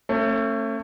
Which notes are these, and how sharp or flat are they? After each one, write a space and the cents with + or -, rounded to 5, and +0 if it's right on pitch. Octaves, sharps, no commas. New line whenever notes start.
A3 +25 C#4 -40